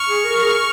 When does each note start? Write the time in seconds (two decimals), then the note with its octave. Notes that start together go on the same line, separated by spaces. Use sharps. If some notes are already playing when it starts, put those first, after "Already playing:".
Already playing: C#6 F6
0.08 G#4
0.24 A#4
0.42 G#4